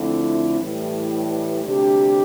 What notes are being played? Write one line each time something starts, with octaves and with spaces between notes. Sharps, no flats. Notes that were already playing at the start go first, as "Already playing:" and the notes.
Already playing: F2 D3 A3 C4 E4
A2 E3 G3
D2 C3 G3 D4 G4